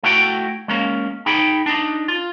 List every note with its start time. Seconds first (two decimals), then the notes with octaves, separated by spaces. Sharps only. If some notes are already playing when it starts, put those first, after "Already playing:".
0.03 A3 E4 F#4 G5
0.68 G#3 A#3 C#4
1.26 D#4 G#4 G5 B5
1.66 D4 D#4
2.08 F4